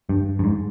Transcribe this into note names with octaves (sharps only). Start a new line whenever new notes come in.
G2
G2
G#2